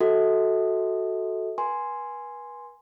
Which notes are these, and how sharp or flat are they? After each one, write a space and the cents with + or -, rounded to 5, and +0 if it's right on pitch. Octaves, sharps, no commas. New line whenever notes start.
F#4 +0 A4 +0 E5 -45
B4 -35 G#5 +0 C6 +0